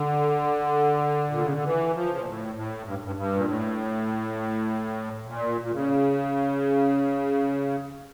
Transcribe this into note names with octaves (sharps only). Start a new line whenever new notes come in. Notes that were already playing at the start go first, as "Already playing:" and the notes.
Already playing: D3
A#2
C#3
D3
E3
F3
C#3
A#2
A2
A2
G2
G2
G2
A#2
A2
A#2
A#2
C#3